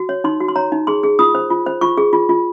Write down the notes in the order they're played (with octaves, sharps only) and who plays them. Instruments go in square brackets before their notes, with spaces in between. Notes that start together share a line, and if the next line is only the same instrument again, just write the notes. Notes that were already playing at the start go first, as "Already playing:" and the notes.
Already playing: [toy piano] F#4
C#5
D#4 C6
F#4
C6
C#5 A#5
D#4
G#4 C6
G#4
F4 D#6
C5
F4
C5
F4 C#6
G#4
F4
F4